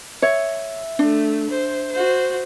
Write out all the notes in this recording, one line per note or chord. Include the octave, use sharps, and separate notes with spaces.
C#5 E5
A3 D4
C5
F#4 C5